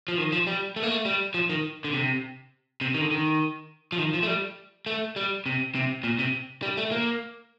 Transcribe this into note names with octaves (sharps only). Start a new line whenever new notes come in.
F3
D#3
F3
G3
A3
A#3
A3
G3
F3
D#3
D3
C3
C3
D#3
D3
D#3
F3
D#3
F3
A3
G3
A3
G3
C3
C3
A#2
C3
G3
A3
A#3